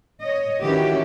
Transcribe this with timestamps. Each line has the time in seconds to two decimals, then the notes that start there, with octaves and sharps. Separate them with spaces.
0.21 C#5 D#5
0.63 D#3 E3 C#4 F#4 G4